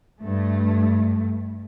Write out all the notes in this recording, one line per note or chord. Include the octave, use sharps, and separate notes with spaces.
G2 A3